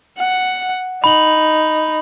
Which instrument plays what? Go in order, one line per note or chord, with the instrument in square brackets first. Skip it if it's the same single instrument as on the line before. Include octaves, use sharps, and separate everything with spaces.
[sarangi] F#5
[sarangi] D#4 [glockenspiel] B5 F#7